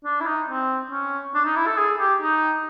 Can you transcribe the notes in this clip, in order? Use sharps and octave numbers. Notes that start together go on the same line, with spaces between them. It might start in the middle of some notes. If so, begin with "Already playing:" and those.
D4
E4
D#4
C4
C#4
D4
D#4
E4
A4
G#4
G4
D#4